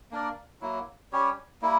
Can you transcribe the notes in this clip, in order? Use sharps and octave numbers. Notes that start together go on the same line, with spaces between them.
A#3 D4 A#4 D5
F#3 A#3 E4
G3 C#4 G4 C#5
G3 A#3 E4